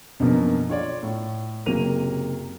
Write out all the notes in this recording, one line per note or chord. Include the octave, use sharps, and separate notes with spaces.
F#2 B2 D3 F3 A#3
F4 C#5 D5
A2
F#1 C3 F#3 A#3 D#7 F7